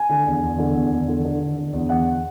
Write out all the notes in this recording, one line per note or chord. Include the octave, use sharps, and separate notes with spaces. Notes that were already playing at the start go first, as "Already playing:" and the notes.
Already playing: G#5
D3
E2
E2
D3
E2
E2
D3
D3
D3
D3
E2
E2 F#5